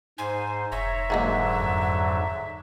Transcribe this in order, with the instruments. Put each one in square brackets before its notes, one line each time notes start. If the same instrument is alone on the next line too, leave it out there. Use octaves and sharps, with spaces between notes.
[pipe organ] G#2 C5 [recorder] G#5
[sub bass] F1 [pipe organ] C#5 A#5 [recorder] E5
[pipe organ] G#2 D3 F#3 [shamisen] G#3 A#3 F#4
[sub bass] F2